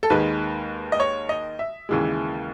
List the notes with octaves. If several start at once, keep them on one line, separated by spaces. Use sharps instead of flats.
A4
D#2 D#3 G#3 B4
D#5
C#5
D#5
E5
D#2 C#3 E3 G#3